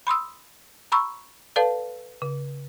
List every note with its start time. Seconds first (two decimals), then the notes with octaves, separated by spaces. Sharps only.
0.07 B5 C6 D#6 E6
0.92 A#5 B5 C#6 E6
1.56 A4 B4 D5 F5 A5
2.22 C#3